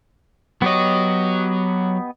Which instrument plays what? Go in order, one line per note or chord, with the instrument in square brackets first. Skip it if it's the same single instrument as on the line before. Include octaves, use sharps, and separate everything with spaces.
[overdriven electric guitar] F#3 C#5 [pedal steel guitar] B3 G4 D#5